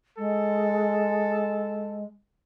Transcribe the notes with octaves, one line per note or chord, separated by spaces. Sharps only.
G#3 A4